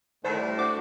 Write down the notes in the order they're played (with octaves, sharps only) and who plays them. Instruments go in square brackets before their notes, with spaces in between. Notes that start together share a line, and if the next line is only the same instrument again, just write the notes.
[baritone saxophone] A2 [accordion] D#3 G#3 A3 [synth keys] C5 [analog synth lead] D5
[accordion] G3
[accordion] D4 F#4 [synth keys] C5 D6